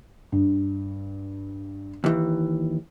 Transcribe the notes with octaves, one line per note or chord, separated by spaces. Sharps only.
G2
D#2 E3